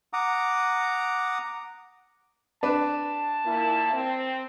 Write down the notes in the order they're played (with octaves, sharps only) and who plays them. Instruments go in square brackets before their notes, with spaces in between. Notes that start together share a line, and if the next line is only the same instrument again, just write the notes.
[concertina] F#5 A#5 D6 D#6
[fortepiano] D4 B4 [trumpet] A5
[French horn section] A#2 A#3 E4
C4